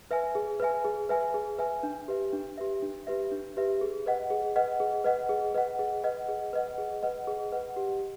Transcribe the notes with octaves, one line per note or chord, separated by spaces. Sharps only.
B4 E5 G#5
G#4
B4 E5 G#5
G#4
B4 E5 G#5
G#4
B4 E5 G#5
D4
G4 B4 E5
D4
G4 B4 E5
D4
G4 B4 E5
D4
G4 B4 E5
G#4
B4 D#5 F#5
G#4
B4 D#5 F#5
G#4
B4 D#5 F#5
G#4
B4 D#5 F#5
G#4
B4 D#5 F#5
G#4
B4 D#5 F#5
G#4
B4 D#5 F#5
G#4
B4 D#5 F#5
G4